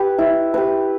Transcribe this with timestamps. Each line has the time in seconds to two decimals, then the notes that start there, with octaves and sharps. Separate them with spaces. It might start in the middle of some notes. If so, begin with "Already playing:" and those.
Already playing: G4 B4
0.18 E4
0.54 G4 B4